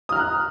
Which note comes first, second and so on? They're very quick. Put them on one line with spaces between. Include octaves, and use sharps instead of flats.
D#6 F6 A#5 F#6